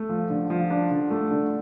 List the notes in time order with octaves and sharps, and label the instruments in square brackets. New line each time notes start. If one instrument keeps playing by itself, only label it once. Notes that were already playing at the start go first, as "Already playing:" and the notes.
Already playing: [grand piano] A3
F3
D3
F3
D4
D3
A3
D3